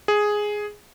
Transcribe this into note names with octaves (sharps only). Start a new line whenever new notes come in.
G#4